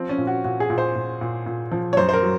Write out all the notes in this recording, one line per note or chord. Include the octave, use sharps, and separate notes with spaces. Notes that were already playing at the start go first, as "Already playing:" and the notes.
Already playing: F3 C4
C#4
A#2
F#4
A#2 F#4
G#4
A#2
C5
A#2
A#2
A#2
F3
C#5
F#2 C5
C5
A#4
F#3